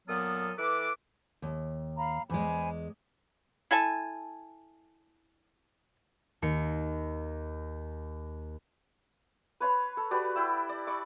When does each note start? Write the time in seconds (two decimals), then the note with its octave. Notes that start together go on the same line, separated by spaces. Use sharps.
0.08 A#2 F#3 B3 A4 D#6 F6
0.58 E3 A4 B4 D6
1.42 D#2
1.97 F5 A#5 B5
2.30 E2 G#3 C5 G#5 B5
3.71 E4 A4 G#5 A5
6.42 D#2 C#7
9.60 B4 C#5 B5 C6
9.97 A4
10.11 F#4 G4 B4 D5
10.36 E4 G5 E6
10.69 D5
10.87 D5 C#6 D6